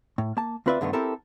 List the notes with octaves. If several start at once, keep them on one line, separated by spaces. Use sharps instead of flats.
A2
A#3 A5
D2 C4 F4 B4 D5 E5
G2 D3 D#3 A3 B3
C4 E4 G4 A4 A#4